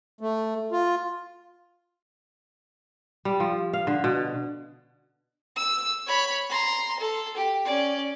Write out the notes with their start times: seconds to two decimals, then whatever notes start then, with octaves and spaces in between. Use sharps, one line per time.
0.21 A3
0.72 F4
3.25 G3
3.40 F3
3.73 F5
3.87 D3
4.04 B2
5.56 E6
6.07 C#5 B5
6.49 A#5 C6
7.00 A4
7.37 G4
7.65 C#4 D5